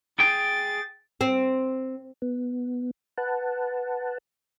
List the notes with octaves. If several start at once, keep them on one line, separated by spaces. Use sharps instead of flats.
G#4 G5 A6
C4
B3
B4 F#5 A5